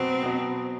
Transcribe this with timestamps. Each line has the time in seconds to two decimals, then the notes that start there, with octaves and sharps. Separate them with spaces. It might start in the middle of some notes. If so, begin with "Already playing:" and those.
Already playing: B2 F#3 B3 C4 F#4
0.21 B2 F#3 B3 F#4